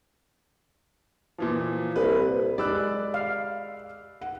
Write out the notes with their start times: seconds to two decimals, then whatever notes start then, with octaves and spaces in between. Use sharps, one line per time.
1.38 A#2 E3 F3
1.96 C2 B4
2.58 G#3 G4 D5 B5 E6 F#6
3.14 F5
4.21 F#5